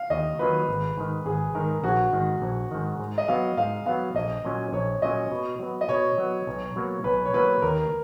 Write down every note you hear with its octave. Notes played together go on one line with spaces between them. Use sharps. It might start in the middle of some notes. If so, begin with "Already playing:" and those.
Already playing: F5
D#2 D#5
D#3 F#3 A#3 F4 B4
G#1
G#2 D#3
G#1 G#4
G#2 D#3 A#4
A#1 F#4
G#2 D#3
A#1
G#2 D#3
G#2
D#5
F#3 B3 F5
G#2 F5
F#3 B3 F5
A#1 D#5
A#2 F#3 C#4
A#1 C#5
A#2 F#3 C#4 D#5
B2
F#3 B3
D#5
B2 C#5
F#3 B3
B1
B2 F#3 A#3
B1 B4
C#5
B2 F#3 A#3 B4
D#2 A#4